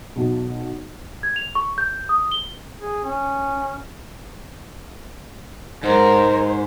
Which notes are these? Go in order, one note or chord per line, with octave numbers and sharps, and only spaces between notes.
B1 B2
G#6
F7
C#6
G6
D#6
G7
G#4
C#4
G#2 G#3 A#4 C5